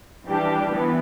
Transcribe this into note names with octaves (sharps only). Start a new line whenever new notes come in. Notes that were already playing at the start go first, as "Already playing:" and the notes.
E3 G3 D4 G4
E3 B3